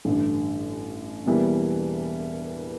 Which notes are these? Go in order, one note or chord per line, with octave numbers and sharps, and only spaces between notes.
A1 G2 D3
E1 E2 E3 G3 A#3